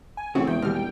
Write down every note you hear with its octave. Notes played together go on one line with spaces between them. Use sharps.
G#5
A1 C#3 C4 F#4
E1 E2 G5
D#2 G3 F6
G5